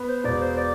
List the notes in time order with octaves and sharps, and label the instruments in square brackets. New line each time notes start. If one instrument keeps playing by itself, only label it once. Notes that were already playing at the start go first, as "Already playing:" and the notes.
Already playing: [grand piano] B3
[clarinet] C5
[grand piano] E1 [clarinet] D5
[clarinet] C5
D5